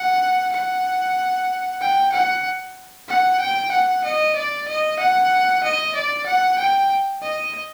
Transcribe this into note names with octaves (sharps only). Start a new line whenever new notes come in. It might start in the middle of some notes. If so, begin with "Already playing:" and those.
Already playing: F#5
F#5
G5
F#5
F#5
G5
F#5
D#5
D5
D#5
F#5
D#5
D5
F#5
G5
D#5